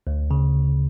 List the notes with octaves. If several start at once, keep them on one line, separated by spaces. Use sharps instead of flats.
D2
C#3